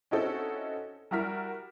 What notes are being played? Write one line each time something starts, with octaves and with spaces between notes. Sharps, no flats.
C4 C#4 D#4 E4 F#4 A4
G3 E4 F#4 A#4 F6 B6